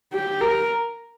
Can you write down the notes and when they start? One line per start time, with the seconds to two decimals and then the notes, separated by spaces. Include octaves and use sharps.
0.13 G4
0.41 A#4